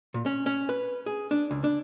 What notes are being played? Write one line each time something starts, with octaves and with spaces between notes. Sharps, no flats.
A#2
C#4
C#4
B4
G#4
D4
C#2
D4